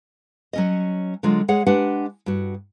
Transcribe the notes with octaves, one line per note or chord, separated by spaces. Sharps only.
F#3 C#4 D#5
D3 F#3 G#3 F4
G#3 G#4 C#5 F#5
G#3 D4 G4 B4 F#5 G#5
G2 F#4